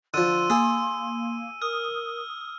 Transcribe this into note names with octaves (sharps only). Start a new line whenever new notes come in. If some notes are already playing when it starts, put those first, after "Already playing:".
D3 F3 C6 E6 D#7
A#3 G#4 A4
A#4 D#6 F6